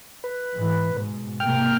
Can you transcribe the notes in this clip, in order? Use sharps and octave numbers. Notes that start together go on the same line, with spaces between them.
B4
G#2 E3
G#2 B2
C3 A#3 G5 F6